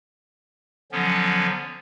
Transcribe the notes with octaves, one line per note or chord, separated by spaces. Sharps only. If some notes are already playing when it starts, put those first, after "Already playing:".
D3 F3 F#3 B3 C#4